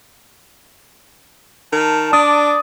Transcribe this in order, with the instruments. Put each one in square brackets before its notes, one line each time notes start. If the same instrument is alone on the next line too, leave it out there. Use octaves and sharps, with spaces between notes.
[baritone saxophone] D#3 [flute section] A5
[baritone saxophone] D4 [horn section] D5 [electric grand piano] D#6